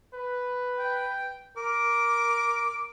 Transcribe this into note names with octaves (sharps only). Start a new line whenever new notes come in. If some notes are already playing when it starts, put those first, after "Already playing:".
B4
G5
A#4 D6